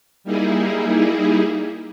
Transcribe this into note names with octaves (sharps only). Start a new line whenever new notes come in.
G3 A#3 D#4 E4 G#4